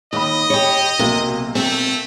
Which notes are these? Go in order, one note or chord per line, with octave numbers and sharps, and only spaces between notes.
D#2 D#5 B5 D6 D#6
G4 C#5
B1 C3 A#3
A3 C4